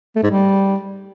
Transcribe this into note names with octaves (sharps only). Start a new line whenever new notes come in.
A3
G#2
G3